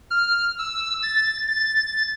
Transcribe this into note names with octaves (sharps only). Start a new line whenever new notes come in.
F6
E6
A6
A6